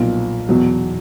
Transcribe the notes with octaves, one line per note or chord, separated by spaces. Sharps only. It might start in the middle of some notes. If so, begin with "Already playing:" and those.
Already playing: B1 A#2 F3
E2 B2 F#3